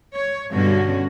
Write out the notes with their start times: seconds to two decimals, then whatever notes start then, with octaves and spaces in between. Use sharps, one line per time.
0.14 C#5
0.52 G2 B2 D3 G3 C#4 F#4